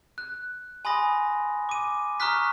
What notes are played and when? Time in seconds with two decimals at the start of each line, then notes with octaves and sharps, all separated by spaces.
0.18 F#6
0.85 G#5 B5 C6 D#6 A#6
1.69 D6 D#7
2.20 A#5 C#6 D#6 F6 F#6 B6